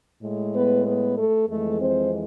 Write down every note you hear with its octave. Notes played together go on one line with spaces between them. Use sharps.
A2 G#3
B3 B4
B3 B4
A3 A4
F2 E3 G#3 A3 A4
C4 C5